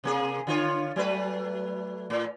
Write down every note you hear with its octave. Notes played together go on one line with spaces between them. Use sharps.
C3 A#3 G#4
D3 F4 C#5
F#3 A3 B4
A2